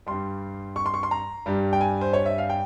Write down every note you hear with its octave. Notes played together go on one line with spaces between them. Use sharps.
G2 G3 C6
C#6
C6
C#6
C6
A#5
G2 G3
G5
G#5
C5
C#5
E5
F5
G5